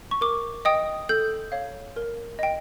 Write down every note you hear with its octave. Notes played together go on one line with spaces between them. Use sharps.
C#6
A#4 D6
D#5 G5 D#6
A4 G6
C#5 F5
A#4
D#5 G5